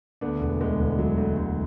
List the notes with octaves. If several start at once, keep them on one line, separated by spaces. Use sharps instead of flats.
D2 B3 D4
E1
D2 G#3 B3
E1
E1 F#3
D2
D2